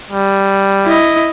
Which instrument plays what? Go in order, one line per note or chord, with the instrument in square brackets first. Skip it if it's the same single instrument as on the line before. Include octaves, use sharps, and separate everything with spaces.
[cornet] G3
[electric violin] E4 D#5